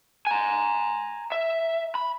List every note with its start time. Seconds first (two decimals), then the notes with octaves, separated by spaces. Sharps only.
0.27 G#5 A#5
1.32 E5
1.95 B5